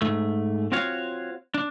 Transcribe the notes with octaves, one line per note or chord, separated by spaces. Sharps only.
G#2 A3
C4 F4 F#4 C#5 F5
D4